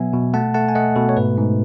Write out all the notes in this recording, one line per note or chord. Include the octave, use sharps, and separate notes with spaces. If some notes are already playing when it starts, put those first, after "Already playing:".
Already playing: B2 F#3 B3 E5 G#5
B2
A3 F#5 A5
A3 F#5 A5
G#5
A3 D#5 F#5
B2 A4
C#5
G#2 B4
G#2